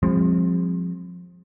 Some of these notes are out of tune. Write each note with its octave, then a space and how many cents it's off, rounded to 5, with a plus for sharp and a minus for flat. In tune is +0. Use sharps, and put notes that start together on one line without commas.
F3 +20 G#3 -35 C4 +15